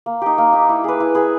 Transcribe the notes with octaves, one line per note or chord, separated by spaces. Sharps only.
A#3
D#4 G4
A#3
D#4 G4
E4
G#4 B4
E4
G#4 B4